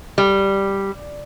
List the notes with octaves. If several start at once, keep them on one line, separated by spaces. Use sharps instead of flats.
G3